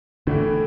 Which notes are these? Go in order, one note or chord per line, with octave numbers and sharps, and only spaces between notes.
A2 D3 E3 A3